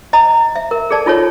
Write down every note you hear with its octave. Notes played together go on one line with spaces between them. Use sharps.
D#5 A#5
E5
A#4
G#4 A4 D5 A5
D#4 F4 A4 C#5